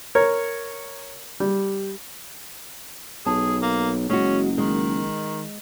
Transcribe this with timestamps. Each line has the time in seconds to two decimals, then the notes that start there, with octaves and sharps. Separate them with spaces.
0.15 A#4 C#5
1.40 G3
3.26 B1 G#4 A5
3.62 A#3
4.09 F#1 G#3 C#4 F#4
4.58 D#3 G#3